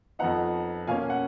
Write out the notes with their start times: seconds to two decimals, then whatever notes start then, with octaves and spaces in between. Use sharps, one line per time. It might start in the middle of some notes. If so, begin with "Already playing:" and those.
0.19 F2 F3 B3 D#4 F#5 A#5
0.87 B2 A#3 C#4 F5 G#5
1.10 F#5